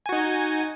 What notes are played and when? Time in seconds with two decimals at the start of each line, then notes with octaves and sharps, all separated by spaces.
0.06 G#5
0.09 F#4
0.12 D#4